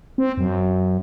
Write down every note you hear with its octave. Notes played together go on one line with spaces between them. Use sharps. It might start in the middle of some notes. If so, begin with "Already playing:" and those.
C4
F#2